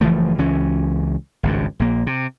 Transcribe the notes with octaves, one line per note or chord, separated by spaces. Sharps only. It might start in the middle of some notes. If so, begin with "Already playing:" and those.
F#1 E3 F3 A3
C#2 E3 C#4
G#1 C#2 G2
A#1 A#3
C3